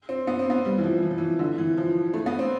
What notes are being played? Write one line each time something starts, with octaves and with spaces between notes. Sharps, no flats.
C4
B3
C4
B3
G3
E3
F3
E3
F3
E3
D3
E3
F3
A3
B3
C4